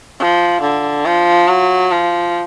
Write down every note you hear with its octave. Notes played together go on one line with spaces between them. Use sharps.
F3
D3
F3
F#3
F3